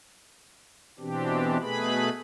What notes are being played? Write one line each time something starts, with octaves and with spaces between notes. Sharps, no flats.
B2 E3 C4 D4 G4
B2 A3 G#4 B4 B5